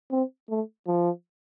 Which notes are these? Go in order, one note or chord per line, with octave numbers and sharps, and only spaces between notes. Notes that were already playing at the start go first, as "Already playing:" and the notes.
C4
A3
F3